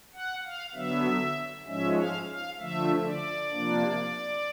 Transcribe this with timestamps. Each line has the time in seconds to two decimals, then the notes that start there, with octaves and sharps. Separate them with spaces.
0.14 F#5
0.45 F5
0.75 D3 F#3 B3 E5
1.67 G#2 F3 G#3 C#4 E5
1.98 F5
2.29 F5
2.59 D3 F3 A3 E5
3.05 D5
3.51 C3 F3 A#3 D4